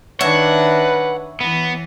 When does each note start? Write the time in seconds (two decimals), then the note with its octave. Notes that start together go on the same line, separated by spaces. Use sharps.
0.21 D#3 D4 B4 C#5 E5 F#5
1.41 E3 B3